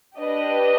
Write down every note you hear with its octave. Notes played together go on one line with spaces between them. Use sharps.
D4 G4 B4 D#5